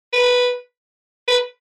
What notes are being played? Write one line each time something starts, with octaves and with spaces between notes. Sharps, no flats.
B4
B4